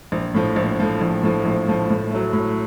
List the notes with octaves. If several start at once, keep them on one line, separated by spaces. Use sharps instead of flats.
A#1
A2 F3
A#1
A2 F3
A#1
A2 F3
A#1
A2 F3
A2
F#3 A3
A2